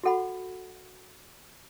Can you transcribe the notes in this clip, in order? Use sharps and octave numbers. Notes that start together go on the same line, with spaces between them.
F#4 A4 F#5 B5